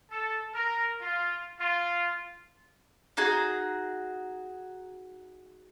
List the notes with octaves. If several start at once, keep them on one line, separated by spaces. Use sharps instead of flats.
A4
A#4
F4
F4
D#4 F#4 G#4